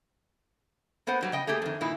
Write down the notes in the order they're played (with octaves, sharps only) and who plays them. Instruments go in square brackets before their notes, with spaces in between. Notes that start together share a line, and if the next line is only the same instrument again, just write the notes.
[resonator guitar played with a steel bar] A#3 B3 A#4 C5 F#5
G2 F#3 G3
C#3 D#5 G5
A3 A#3 G4 G#4
F2 D#3
G2 A#2 D#3 E4